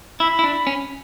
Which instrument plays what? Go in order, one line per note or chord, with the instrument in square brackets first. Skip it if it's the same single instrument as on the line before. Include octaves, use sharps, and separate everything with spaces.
[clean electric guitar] E4 [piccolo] B5
[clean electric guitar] E4
D4
C#4